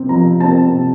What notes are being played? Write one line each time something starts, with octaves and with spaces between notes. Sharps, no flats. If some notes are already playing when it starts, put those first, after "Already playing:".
Already playing: C3 C4
F3 A#5
C4 A5
C3